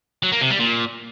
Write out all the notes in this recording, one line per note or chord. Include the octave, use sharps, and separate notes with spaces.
F#3
A#3
C3
G3
A#2